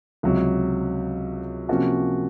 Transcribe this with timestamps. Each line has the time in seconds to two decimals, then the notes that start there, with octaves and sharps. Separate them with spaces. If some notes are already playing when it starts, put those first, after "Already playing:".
0.23 C#2 C3 F#3
1.68 C3 F3 A#3 C#4 F#4